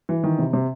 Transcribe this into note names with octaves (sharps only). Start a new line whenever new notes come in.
E3
D#3
C3
C3